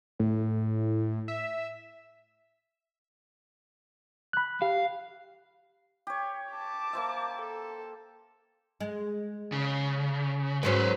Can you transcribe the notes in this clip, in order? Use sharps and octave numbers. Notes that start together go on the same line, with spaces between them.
A2
E5
B5 F#6
G4 F5
G4 C#5
A5 D6
A#3 C5 E5
A4
G#3
C#3
G#2 F#3 C#4 B4 C5